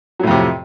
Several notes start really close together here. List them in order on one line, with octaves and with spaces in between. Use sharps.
F#3 A2 F2 C3